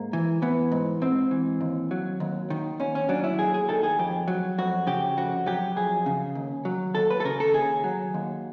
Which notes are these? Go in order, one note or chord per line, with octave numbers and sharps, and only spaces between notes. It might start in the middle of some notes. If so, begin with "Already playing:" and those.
Already playing: G#2 A#3
E3
E3 B3
G#2
G#2 C4
E3
D#2
F#3
D#2
D#3
D#2 C#4
C#4
F#3 D4
E4
D#2 G#4
G#4
D#3 A4
G#4
F2 G4
F#3
F2 F#4
C#3 G4
F2 F#4
F#3 G4
F2 G#4
C#3
D#2
F#3
D#2 A4
B4
A4
C#3 A#4
A4
D#2 G#4
F#3
D#2